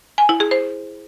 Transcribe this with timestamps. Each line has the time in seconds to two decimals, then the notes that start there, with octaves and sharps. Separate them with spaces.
0.18 G#5
0.29 E4
0.40 G#4
0.51 C5